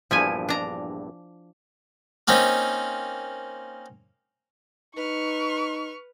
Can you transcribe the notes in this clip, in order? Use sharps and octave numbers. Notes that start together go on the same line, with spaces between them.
A#1 E2 G2 F3 E4 G#5
D4 A#5
A#3 C4 C#4 D#4
D#4 B4 C#6 F6